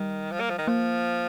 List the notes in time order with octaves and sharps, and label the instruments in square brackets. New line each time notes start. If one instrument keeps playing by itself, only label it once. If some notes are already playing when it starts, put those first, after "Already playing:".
Already playing: [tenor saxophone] D#3 [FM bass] G3
[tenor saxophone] F3
A#3
F3
D#3
[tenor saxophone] F3 [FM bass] A#3